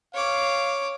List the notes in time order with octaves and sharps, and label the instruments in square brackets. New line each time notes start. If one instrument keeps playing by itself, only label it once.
[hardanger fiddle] C#5 D6 [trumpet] F5